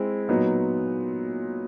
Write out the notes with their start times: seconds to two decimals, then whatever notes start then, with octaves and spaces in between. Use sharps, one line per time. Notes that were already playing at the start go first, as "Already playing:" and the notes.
Already playing: G#3 C4 E4
0.29 A#2 F#3 B3 D#4